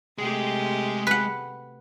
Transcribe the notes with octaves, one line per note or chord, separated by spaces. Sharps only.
C3 G#3 A3 G4 G#4
B4 F#5